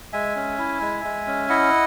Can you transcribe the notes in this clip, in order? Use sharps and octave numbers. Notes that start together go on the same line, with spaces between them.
G#3 E5 G#5
C#4
E4
G#3
G#3
C#4
E4 D#5 F#5